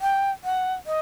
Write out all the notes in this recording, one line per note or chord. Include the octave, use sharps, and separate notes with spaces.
G5
F#5
D#5